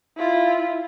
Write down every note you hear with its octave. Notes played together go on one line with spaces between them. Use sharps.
E4 F4